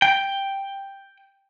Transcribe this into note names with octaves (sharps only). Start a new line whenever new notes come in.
G5